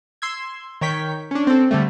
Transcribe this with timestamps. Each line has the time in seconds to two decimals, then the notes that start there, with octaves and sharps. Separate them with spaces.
0.22 C6 E6 G#6
0.81 D#3 C#5 G5 B6
1.31 C#4 D4
1.47 C4 A4
1.71 D3 G3 A3